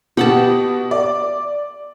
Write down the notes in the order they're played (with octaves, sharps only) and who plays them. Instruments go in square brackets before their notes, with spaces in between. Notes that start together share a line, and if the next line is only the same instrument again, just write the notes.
[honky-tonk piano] B2 F#7 [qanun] G4 F#5 A5
[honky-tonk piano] D5